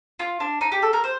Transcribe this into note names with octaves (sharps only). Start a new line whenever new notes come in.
F4
D4
D#4
G4
A4
A#4
C5